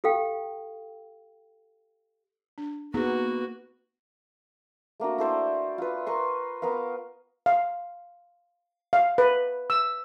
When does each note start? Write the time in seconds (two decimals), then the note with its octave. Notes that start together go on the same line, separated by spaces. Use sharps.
0.04 G4 A4 F5 G5
2.58 D4
2.94 A#3 B3 D#4 F#4 G#4
5.00 A3 A#3 D4 F#4
5.18 E4 A4 C5 D5
5.78 F4 B4
6.06 A#4 B4 C6 C#6
6.62 B3 A#4 B4 F5
7.46 F5
8.93 F5
9.18 B4
9.70 E6